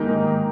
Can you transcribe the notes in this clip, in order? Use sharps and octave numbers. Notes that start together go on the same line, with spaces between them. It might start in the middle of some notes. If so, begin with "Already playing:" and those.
Already playing: G#2 D#3 A#3 D#4 G4 G#4 A#4